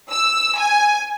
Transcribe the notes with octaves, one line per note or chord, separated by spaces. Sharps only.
E6
G#5